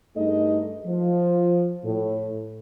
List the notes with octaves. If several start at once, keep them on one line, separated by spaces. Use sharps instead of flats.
G2 A3 D#4 G#4 D#5
F3
A2